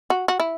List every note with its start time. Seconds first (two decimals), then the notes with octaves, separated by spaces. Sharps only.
0.10 F#4
0.28 F#4
0.40 E4